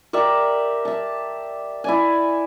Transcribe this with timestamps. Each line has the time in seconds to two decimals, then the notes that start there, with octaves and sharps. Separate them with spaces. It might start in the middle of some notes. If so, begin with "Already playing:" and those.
0.13 G4 A#4 D5 E5
0.85 E5 A5
1.84 E4 D5 G#5